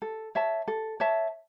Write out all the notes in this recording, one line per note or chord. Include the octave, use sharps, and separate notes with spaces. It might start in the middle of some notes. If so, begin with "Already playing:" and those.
A4
C#5 E5 A5
A4
C#5 E5 A5